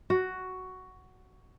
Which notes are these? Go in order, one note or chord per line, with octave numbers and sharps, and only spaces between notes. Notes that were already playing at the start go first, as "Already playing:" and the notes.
F#4